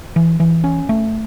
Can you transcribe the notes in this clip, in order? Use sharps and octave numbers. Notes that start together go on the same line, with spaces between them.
E3
E3
C#4
A3